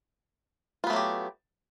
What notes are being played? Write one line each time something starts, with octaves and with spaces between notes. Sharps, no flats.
F#3 A3 B3 F4 G4